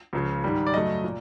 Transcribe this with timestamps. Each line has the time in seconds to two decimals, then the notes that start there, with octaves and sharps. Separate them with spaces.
0.13 C#2 C#3 F3
0.44 G#2 D#3 G3
0.67 D5
0.74 F#2 C#3 F#3 A3 D#5
1.04 A#2